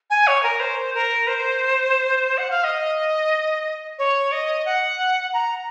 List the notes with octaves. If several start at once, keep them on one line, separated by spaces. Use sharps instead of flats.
G#5
C#5
A#4
C5
A#4
C5
F#5
F5
D#5
C#5
D#5
F#5
A#5